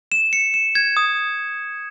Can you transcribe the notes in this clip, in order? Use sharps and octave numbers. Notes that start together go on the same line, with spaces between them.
E7
C#7
E7
G#6
D#6